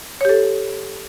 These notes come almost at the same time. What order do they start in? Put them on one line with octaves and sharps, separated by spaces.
C#5 G4 A4